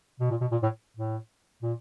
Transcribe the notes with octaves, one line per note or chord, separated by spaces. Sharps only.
B2
A#2
B2
A#2
A2
A2
A#2